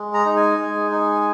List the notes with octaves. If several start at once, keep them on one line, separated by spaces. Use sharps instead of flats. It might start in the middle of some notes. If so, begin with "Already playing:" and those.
Already playing: G#3
A#5
D#4
G#5
G#3
D#4